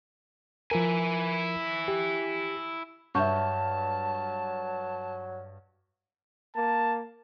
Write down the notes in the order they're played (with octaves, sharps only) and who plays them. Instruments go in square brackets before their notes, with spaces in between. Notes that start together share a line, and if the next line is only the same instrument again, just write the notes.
[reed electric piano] F3 A#4 [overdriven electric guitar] E4 G#5
[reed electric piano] G4
[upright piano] G2 G6 [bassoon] F#3 [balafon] E5 C#6 [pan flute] A5
[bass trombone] A#3 [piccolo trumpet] A5